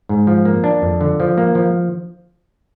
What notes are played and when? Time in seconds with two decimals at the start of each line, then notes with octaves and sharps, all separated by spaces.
0.09 G#2
0.27 F3
0.45 A#3
0.64 D4
0.82 F2
1.01 D3
1.20 F3
1.38 A#3
1.55 F3